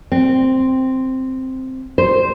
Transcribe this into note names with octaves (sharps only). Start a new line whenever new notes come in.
C4
C5